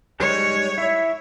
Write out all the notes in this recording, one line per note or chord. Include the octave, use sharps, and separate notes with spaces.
G3 G#3 D#4 C#5
E4 E5